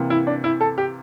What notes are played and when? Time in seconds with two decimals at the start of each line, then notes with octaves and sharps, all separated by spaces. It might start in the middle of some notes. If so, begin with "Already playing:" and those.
Already playing: C3 E3 A#3
0.10 E4
0.27 D4
0.44 E4
0.61 A4
0.78 G4